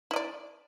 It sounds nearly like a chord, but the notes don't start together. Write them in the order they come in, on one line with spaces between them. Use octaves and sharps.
E4 D#5 D5